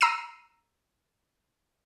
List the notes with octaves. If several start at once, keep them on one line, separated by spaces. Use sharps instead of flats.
A#5 E6 C7 D#7